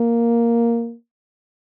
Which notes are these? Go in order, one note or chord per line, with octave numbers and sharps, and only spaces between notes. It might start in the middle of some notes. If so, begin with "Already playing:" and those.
Already playing: A#3